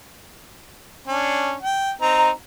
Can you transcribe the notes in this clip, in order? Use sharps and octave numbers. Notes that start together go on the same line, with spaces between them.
C#4 D4
G5
C4 D#4 A#5